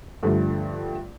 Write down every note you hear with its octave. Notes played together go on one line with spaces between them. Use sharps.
G2 D3 F3 G3 A3